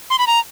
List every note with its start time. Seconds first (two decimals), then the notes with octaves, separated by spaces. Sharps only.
0.10 C6
0.19 B5
0.27 A#5